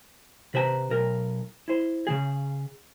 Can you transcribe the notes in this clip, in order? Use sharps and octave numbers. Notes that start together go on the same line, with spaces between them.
C3 B4 C5 G#5 A#5
B1 A#4
E4 C5
C#3 F#3 G#4